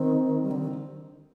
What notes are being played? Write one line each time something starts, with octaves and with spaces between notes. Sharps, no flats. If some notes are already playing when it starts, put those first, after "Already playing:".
Already playing: D#3 C4
G3
D3
D#3